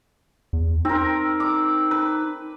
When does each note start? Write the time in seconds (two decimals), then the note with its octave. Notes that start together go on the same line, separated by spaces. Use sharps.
0.53 E2
0.85 C4 D#4 A#4
1.40 D6
1.91 B4